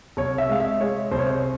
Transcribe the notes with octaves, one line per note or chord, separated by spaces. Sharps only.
C2 C#5
E5
G#3 F5
E5
G#3 C#5
C2 C5
C#5
C5